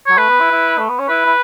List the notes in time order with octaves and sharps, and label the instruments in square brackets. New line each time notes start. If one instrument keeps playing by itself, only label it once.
[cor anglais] F#3 [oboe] C#5
[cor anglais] A3 [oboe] B4
[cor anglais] B3
E4
E4
A3
B3
C#4
[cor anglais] E4 [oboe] B4
[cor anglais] E4